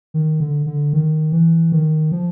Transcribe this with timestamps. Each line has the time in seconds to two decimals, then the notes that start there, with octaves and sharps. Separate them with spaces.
0.14 D#3
0.40 D3
0.66 D3
0.93 D#3
1.32 E3
1.72 D#3
2.12 F3